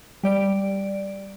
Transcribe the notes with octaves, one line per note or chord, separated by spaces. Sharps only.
G3 D5 D7